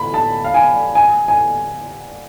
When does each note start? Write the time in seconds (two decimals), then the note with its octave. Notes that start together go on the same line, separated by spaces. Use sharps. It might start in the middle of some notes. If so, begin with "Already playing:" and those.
Already playing: B5
0.14 A5
0.44 F5
0.54 G#5
0.95 G#5
1.28 G#5